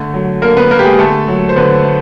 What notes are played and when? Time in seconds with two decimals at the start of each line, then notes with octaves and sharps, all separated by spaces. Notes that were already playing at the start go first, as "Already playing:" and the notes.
Already playing: D3 A3
0.14 F#3
0.42 D3 A#3 A#4
0.57 B3 B4
0.71 A#3 A#4
0.79 G4
0.85 G#3 G#4
0.99 D3 A3 A4
1.28 F#3
1.49 C5
1.56 D3 B3 B4
1.85 A3